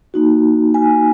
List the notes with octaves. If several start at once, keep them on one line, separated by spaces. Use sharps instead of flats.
A#3 D#4 F#4
G#5